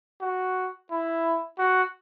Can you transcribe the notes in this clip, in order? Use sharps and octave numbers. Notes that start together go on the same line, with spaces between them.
F#4
E4
F#4